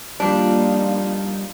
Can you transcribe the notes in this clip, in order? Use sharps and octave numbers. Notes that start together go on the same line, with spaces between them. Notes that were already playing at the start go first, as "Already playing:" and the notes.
F3 G3 A#3 D4 D#4 F4